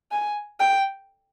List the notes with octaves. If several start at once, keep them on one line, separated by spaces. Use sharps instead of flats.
G#5
G5